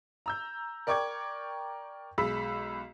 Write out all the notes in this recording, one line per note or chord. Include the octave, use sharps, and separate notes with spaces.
A#5 E6 G6
A#4 D5 G5 C#6 D6 G#6
B1 G#3 B5 E6 B6